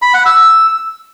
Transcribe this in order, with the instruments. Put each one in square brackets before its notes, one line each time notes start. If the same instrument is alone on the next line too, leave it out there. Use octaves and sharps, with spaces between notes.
[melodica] B5
F#5
E6